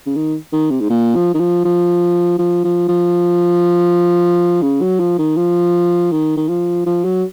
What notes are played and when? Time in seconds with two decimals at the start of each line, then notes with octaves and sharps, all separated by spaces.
0.06 C#3
0.15 D#3
0.53 D#3
0.71 C3
0.81 G#2
0.90 A#2
1.15 F3
1.34 D#3
1.40 F3
1.65 F3
2.39 F3
2.64 F3
2.89 F3
4.62 C#3
4.81 F#3
5.00 F3
5.19 D#3
5.37 F3
6.12 D#3
6.37 D#3
6.48 F3
6.86 F3
7.04 F#3